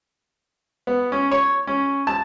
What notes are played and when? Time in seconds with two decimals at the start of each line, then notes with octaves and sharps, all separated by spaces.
0.87 B3
1.12 C#4
1.31 C#5
1.67 C#4
2.07 A5